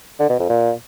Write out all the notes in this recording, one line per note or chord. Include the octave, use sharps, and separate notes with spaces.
D3
B2
F2
A#2